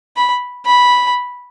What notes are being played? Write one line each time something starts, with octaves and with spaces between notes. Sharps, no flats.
B5
B5